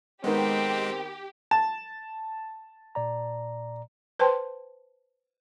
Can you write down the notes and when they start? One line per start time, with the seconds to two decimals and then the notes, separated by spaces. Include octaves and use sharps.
0.24 D#3 G#3 B3 C4 G4
1.51 A5
2.95 A#2 D5 A#5
4.19 B4 C5 G5 A5 C6